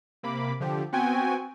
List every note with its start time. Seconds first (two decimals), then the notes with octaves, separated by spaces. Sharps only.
0.23 C3 A#3 B5 D6
0.60 D3 F3 G4
0.92 B3 C4 F#4 G5 G#5